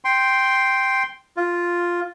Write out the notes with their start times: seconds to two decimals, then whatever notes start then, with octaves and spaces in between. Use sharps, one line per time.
0.05 G5 C6
1.37 F4